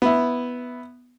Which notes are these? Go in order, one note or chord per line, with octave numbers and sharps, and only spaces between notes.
B3 E4